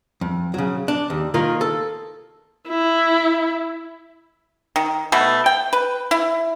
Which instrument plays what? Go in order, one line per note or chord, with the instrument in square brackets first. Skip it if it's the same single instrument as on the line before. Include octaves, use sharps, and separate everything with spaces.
[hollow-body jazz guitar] F2
C#3 F#3
D4
D#2
D#3 A#3 F4
A4
[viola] E4
[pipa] D#3
B2 A3 B4
G5
B4
E4